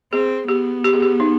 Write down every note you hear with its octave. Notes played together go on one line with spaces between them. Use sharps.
C4 G#4
B3 G4
G4
G#4
G4
D#4